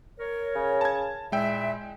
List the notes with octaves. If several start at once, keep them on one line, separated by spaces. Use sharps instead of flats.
A#4 C#5
C#3
A5 G#6
A#2 G#3 E4 E5 G5